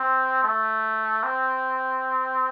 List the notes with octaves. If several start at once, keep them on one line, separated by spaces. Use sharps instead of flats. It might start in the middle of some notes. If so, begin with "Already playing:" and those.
Already playing: C4
A3
C4